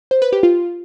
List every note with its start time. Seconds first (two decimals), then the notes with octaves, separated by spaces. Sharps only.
0.11 C5
0.22 B4
0.33 G4
0.43 F4